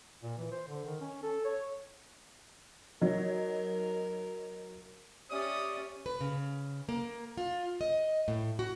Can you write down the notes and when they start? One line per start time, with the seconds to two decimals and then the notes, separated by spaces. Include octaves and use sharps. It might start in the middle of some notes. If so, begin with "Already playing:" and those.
0.23 A#2
0.38 E3
0.52 C5
0.68 D3
0.85 D#3
1.01 C#4
1.23 A4
1.45 C#5
3.01 F#3 D#4 A#4
5.31 C#4 G4 D5 E5 D#6
6.06 B4
6.21 C#3
6.89 A#3
7.38 F4
7.81 D#5
8.28 A2
8.59 F#4